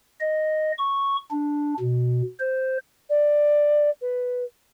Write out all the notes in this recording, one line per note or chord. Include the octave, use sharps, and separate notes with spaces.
D#5
C#6
D4
B2
C5
D5
B4